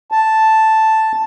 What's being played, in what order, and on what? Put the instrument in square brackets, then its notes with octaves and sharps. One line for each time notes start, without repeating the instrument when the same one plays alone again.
[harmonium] A5